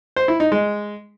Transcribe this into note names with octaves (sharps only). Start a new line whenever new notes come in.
C5
E4
D#4
G#3